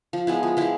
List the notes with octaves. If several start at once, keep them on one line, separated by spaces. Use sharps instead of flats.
F3
G#3 B3 E4
F3
G#3 B3 E4